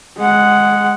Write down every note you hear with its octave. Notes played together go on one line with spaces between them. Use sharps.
G#3 F#5